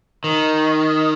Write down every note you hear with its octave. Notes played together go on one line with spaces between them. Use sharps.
D#3